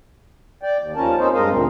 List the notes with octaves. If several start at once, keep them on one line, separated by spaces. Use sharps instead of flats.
D5 G5
D#2
D#2 F3 C#4 A#4 A5
C4 C#4 D#4 A4 C5
G2 G#3 A#4 D#5 F5
D2 A#2 C4